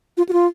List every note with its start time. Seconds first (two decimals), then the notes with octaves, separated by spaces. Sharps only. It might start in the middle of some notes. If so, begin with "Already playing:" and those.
0.17 F4
0.29 F#4
0.33 F4